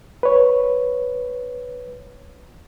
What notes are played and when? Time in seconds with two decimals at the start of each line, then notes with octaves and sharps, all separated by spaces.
0.23 B4 C#5